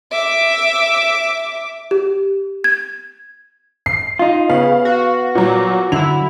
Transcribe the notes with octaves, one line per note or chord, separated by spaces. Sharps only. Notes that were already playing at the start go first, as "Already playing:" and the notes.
E5 D6
G4
G#6
C7
D#4 F4
C#3 B3 F5
F#4
A#2 F#3
D3 F#3 E4 F7